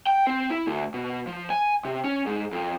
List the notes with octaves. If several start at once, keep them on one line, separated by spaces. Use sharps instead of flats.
G5
C4
E4
D2
B2
F3
G#5
C3
C#4
G#2
F2